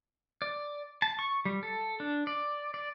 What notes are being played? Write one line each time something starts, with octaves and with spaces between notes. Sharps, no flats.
D5
A5
C#6
G3
A4
D4
D5
D5